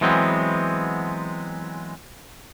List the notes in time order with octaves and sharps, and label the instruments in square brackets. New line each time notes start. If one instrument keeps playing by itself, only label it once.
[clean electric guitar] E3 F#3 G#3 B3 C4